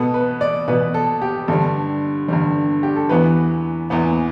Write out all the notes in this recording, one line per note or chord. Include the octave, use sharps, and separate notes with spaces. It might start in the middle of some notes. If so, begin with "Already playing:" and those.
Already playing: B2 B3 A4
B4
D5
B2 B3 B4
A4
G4
G2 D3 G3 A4
G2 D3 G3
G4
A4
E2 E3 B3 B4
E2 E3 B3